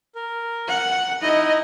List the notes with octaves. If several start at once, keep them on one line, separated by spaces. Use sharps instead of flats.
A#4
F#5
D#4 E4 D#5